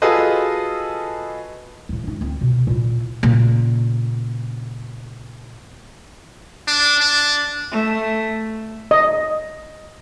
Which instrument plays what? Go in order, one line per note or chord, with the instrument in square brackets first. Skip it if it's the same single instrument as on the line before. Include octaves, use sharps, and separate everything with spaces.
[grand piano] F4 F#4 G#4 A4 B4 D#5
[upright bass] D#2 A2
C#2 D#4
D2 C4
B2
A#2 E4
A#2 C#3
[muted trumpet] D4
D4
[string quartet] A3
[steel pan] D#5